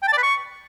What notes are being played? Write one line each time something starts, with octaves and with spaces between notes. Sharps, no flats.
G5
A5
D5
B4
C#6